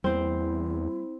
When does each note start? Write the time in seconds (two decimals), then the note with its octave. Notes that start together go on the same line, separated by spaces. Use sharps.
0.04 E2 G3 A#3 C4 E4 C5